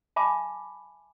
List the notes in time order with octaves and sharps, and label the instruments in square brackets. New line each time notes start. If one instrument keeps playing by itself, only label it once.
[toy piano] E5 G#5 A5 B5 D6